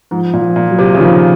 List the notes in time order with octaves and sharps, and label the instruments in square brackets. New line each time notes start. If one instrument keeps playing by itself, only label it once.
[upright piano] G#2 [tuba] F3
[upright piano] A#2
[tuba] F3
[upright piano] A#2
[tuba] F#3
[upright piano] C3
C#3
[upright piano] D#3 [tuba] F3